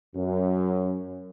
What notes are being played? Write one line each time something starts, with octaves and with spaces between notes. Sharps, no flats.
F#2